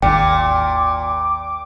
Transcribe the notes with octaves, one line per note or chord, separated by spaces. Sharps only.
G#1 D#2 A#2 G5 D6